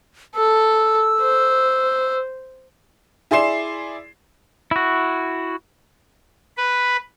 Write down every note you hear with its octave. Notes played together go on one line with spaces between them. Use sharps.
A4 E6
C5
E4 G#4 D5 C6 C7 E7
E4 F#4
B4